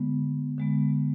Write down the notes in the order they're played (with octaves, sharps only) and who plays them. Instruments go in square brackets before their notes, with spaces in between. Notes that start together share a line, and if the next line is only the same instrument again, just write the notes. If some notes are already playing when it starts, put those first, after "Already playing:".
Already playing: [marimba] D3 G#3 B3
D3 G#3 B3